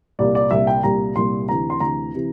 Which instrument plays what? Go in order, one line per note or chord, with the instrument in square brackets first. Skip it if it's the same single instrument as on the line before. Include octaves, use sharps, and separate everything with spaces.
[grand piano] C2 A#2 G3 D5
D5
C2 A#2 G3 E5
G5
C2 A#2 G3 A#5
C2 A#2 G3 C6
D2 C3 E3 A#5
C6
D2 C3 E3 A#5
C3 E3